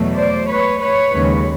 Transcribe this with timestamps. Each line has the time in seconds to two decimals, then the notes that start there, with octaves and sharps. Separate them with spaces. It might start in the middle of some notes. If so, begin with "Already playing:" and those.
Already playing: E2 B2 F#3 A3
0.16 C5 D5
0.48 B4 C#5
0.80 B4 C#5
1.11 D#2 C#3 F3 G#3